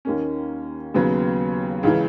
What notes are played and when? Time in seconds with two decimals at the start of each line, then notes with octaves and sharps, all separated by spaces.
0.05 D#2 D#3 A#3 C#4
0.94 D#2 C#3 F#3 B3
1.83 C#2 C#3 E3